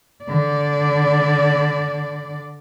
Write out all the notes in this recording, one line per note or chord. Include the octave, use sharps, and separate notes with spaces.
D3 D5